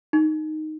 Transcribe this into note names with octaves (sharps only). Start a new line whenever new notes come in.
D#4